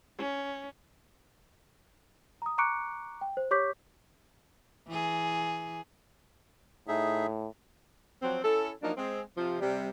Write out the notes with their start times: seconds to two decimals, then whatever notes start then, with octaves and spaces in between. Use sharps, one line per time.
0.19 C#4
2.42 A#5 D#6
2.58 A#5 C#6 D6 F#6 C#7 D7
3.21 G5
3.37 C5
3.51 G4 C#5 C#6 D6 G6 B6
4.88 E3 G#4
6.88 A2 D#4 G#4 E5
8.22 F3 F#3 C4
8.44 C#4 E4 A4
8.82 F3 F#3 A#3 D4 D#4
8.97 G#3 C4
9.37 C3 F3
9.60 C3 G3